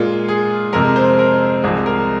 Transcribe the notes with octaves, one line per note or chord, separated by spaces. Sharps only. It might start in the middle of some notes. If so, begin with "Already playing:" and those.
Already playing: A#2 G#3 F4
G#4
F2 C3 G#3 A#4
C5
A#4
C2 C3 F3 G#3 G#4
A#4